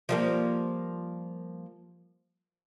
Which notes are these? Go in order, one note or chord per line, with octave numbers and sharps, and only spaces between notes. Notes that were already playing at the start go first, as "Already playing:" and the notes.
F3 G3 A#3